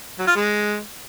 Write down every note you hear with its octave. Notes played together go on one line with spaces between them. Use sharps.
F#3
F4
G#3